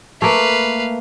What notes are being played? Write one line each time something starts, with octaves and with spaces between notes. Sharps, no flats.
A3 A#3 B4 F5